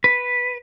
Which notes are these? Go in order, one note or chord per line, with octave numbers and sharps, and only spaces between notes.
B4